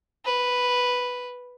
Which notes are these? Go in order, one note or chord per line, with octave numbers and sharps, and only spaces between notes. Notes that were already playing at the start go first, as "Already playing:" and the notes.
B4